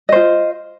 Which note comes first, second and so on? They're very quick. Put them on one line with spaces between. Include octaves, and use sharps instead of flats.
D#5 C5 F4